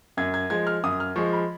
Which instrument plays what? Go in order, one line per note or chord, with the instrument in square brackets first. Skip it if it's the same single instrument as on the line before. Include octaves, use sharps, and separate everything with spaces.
[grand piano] F#2 G#6
G#6
F3 G#3 G#6
F6
F#2 D#6
F6
F3 G#3 C#6
B5